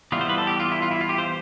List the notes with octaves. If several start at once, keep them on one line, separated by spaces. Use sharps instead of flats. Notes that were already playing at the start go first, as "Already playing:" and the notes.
E3 G3 B3 F4
C5
B4
A4
G4
F4
E4
F4
E4
F4
G4
C5